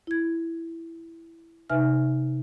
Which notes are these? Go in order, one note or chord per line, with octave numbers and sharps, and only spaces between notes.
E4 G#6
C3 D#4 B4 E5 G#5 F6